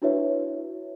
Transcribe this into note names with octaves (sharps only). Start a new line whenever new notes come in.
D4 E4 F#4 B4 C#5 E5